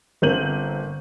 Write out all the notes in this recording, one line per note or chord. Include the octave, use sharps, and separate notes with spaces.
G1 A#3 C4 G6 D#7 F#7